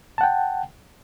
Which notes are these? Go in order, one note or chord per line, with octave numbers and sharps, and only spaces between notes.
F#5 G5 A5